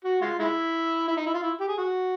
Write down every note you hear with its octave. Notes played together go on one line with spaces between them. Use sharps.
F#4
G#3 F4
G#3 E4
E4
D#4
E4
F4
E4
G4
G#4
F#4